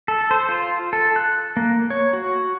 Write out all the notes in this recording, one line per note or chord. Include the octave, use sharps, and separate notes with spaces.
A4
C5
F4
A4
F#6
A#3
C#5
F#4